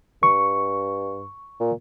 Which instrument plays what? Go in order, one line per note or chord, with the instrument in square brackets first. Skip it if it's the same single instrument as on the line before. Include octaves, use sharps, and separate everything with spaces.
[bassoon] G2 [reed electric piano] C#6
[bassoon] A#2